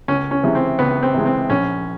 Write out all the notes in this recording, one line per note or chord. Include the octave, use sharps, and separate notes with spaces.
C#2 C#4
C#4
C3 E3 G#3
C4
C#2 B3
C4
C3 E3 G#3
C4
A#1 C#4